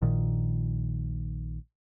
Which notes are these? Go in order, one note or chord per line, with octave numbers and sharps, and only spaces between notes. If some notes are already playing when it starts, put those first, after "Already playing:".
A#1 A#2 D#3